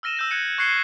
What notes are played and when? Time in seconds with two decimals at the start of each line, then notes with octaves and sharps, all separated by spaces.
0.03 E6 F6 A#6 D#7 E7
0.17 E6 G6 A#6
0.30 F#6 G#6 C#7 D#7
0.58 C#6 F#6 G#6 C7 C#7 G7